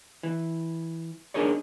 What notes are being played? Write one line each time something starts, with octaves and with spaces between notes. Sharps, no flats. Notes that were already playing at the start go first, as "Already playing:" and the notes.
E3
D4 D#4 G#4 A#4 C#5 D5